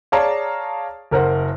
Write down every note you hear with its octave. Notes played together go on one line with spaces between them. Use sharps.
G#4 C#5 D5 F5 A5 A#5
F#1 A#4 C5 F#5